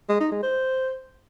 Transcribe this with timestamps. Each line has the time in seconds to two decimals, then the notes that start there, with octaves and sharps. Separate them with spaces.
0.09 G#3
0.20 D#4
0.32 G#3
0.43 C5